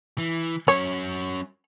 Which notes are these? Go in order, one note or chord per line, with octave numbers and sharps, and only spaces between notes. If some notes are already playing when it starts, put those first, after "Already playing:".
E3
F#3 C#4 C#5